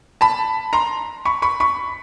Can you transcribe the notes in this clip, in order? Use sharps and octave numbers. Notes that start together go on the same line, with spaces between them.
A5 B5
A#5 C6
B5 C#6
B5 C#6
B5 C#6